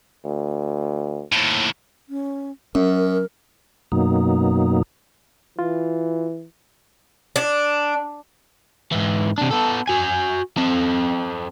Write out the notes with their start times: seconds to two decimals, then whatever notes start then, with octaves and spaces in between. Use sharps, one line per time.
0.25 D2
1.32 D#2 A2
2.09 C#4
2.75 F#2 C#4 A#4
3.92 F#2 B2 F#3 A#3 D#4
5.59 E3 F4
7.36 D4
8.92 G#2 E3
9.38 C3 D4
9.51 B3 A4
9.88 F#4 G#5
10.57 C4 A4